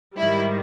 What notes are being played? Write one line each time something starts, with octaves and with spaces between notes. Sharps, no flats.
G#2 D#3 G3 E4